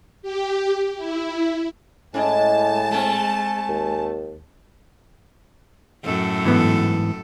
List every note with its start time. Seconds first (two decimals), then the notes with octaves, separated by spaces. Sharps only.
0.22 G4
0.97 E4
2.14 A2 G#3 C#4 E4 D#5 G#5 A5
2.91 A3 C4
3.68 D#2
6.04 F#2 A2 A4
6.44 G#2 E3 B3